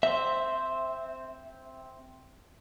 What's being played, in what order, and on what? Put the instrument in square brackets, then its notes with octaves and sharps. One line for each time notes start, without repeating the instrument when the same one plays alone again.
[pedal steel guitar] C4 C5 [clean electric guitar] E5